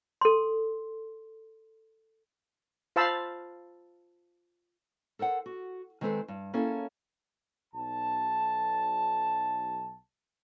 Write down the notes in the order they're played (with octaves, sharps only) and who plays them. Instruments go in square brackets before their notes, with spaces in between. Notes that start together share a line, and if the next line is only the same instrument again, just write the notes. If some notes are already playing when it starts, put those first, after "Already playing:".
[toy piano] A4 C6
[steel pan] F4 C5 F5 A5 B5 E6
[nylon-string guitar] A4 A#4 C5 F#5
F#4
D#3 G#3 C4 A4 B4 C5
G2
A#3 C#4 E4 G#4 A4
[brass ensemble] B1 A5